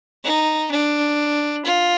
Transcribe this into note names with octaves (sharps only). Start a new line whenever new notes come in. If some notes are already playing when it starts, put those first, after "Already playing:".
D#4
D4
F4